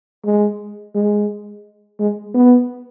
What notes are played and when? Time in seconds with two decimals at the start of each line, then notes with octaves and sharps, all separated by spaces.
0.25 G#3
0.95 G#3
1.99 G#3
2.34 B3